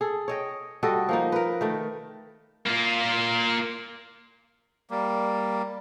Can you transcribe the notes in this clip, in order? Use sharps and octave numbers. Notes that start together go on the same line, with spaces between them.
G#4 A4
C#5 D#5 G5
G3 F#4 A4 D#5
F3 A#3 D#4
A#4 B4
D#3 A3
A#3 F4
G3 A#3